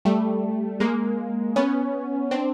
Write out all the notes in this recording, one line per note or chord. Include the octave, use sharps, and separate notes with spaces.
G3 A3
G#3 A#3
B3 C#4
C4 D4